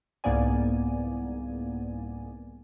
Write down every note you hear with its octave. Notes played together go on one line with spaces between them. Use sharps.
C2 G#2 A#3 B3 D5 G#5